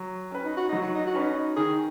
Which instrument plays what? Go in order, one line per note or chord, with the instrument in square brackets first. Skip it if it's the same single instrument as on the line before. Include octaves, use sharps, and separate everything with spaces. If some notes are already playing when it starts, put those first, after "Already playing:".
Already playing: [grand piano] F#3
C#4 B4
[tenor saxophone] D#4
F#4
[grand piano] F#3 [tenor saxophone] D#4
[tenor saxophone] F#4
D#4
F#4
[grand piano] C#4 B4 [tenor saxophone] D#4
[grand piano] D#3 [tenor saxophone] G#4